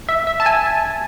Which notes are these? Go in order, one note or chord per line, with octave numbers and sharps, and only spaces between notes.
E5
E5
A5
G#5